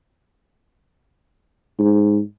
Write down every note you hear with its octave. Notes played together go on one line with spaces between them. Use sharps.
G#2